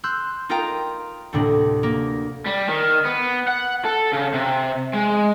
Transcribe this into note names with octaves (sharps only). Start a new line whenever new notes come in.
C6 E6 F#6 G6
D#4 F4 A#4 F5 G5 A#5
D2 A2 C3 A#3 D4
A#3
G3
D#3
B3
F#5
A4
C#3
C3
G#3